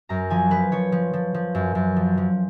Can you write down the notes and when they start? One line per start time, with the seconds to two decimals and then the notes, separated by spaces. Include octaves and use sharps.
0.09 F#2 A#5
0.30 F3 G#5
0.51 F3 B4
0.72 F3 C#5
0.92 F3
1.13 F3
1.34 F3
1.55 F#2
1.75 F#2
1.96 F3
2.17 F3